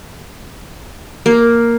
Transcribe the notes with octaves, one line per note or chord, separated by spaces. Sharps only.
A#3